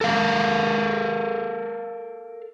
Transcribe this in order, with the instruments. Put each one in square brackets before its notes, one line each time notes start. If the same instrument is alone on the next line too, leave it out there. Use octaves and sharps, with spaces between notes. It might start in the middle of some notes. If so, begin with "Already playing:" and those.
[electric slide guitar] A4 A#4 F5